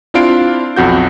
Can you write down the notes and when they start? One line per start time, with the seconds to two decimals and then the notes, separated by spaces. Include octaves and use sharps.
0.14 C4 D4 E4 F4 F5 D7
0.76 B1 F2 F#4 G6